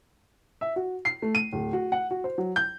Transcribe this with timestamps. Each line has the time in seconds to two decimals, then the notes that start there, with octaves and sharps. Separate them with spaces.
0.61 E5
0.76 F#4
1.05 C7
1.22 A3
1.35 D#7
1.53 D1
1.73 F#4
1.92 F#5
2.11 F#4
2.24 C5
2.38 F#3
2.56 G6